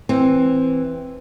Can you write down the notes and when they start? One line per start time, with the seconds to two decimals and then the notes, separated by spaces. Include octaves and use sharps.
0.09 E3 C4